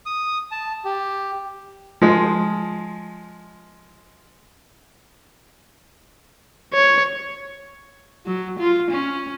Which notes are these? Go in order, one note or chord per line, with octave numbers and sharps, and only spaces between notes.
D#6
A5
G4
F3 G#3
C#5
F#3
F4
C#4